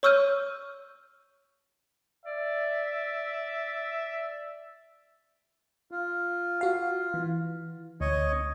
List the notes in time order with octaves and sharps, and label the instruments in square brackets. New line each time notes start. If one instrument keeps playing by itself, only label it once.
[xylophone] C#5 C#6 E6 F6 G6 D#7
[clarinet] D5 [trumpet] E5
[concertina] F4
[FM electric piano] F#4 F5
E3
[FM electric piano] D2 [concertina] C#5 D#5